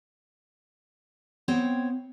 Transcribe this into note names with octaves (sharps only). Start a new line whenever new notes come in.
B3 C4 C5 C#5 G5